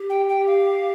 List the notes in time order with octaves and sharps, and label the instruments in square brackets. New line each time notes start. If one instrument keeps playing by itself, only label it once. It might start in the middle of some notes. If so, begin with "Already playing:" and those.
Already playing: [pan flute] G4
[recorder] G5
G5
F5